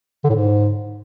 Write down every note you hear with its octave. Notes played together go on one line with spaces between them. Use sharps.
D3
A2
G#2